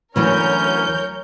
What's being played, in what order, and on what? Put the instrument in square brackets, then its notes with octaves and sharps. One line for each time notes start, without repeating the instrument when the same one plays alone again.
[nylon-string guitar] D2 E3 F#3 [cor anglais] C#4 [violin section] A#4 C#5 G6